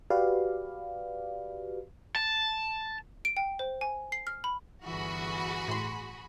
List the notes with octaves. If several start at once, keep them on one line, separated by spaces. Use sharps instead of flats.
F#4 G4 B4 D5 F5
A5
D7
G5
C5
G#5
C7
F6
B5
G1 E3 F#4 G#4 B5
A2 C6